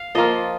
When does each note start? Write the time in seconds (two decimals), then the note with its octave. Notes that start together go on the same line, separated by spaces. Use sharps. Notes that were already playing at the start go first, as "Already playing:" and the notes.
Already playing: F5
0.15 F3 A#3 F4 D#5